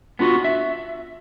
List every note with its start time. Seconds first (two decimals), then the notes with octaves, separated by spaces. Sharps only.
0.19 B3 D4 F4 F#4
0.44 E5